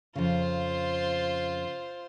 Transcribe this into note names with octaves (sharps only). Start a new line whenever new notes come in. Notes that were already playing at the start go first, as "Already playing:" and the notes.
F2 C#3 F4 C5